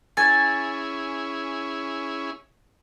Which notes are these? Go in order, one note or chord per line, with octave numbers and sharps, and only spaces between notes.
C#4 E4 G#4 G#5 A6